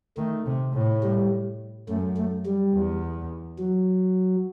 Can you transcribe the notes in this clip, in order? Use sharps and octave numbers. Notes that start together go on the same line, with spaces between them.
D#3 A3
C3
A2
G3
F#2 A3
A3
G3
E2
F#3